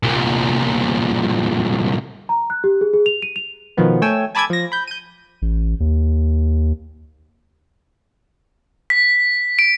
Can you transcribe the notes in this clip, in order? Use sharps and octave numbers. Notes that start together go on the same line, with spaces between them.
C2 A#2
A#5
F#6
G4
G#4
G#4
F7
D#7
F7
B2 D#3 F3 B3
A3 C#5 G5 G#5 E6
G#5 A5 B5 D6 E6 G#6
F3 A#6
B5 G6
G6 D#7
A1
D#2
B6
D7